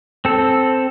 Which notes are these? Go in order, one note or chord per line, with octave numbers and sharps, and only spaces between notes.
C4 A4